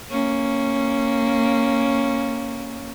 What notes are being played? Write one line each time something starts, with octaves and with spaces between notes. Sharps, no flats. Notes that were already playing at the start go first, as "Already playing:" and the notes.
A#3 C#4